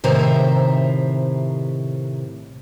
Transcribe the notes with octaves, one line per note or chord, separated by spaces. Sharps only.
A2 C3 D#3 C5 E5 A#5